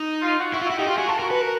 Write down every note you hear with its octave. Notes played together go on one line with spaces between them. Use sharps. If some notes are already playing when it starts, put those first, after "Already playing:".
Already playing: D#4
F4
F#4
E4 F#4
F4
E4
F#4
D#4 G4
F4 G4
F#4 G#4
F4 A4
F#4 A#4
B4
A#4